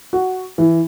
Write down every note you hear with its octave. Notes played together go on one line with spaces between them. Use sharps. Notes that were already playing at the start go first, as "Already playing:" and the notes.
F#4
E3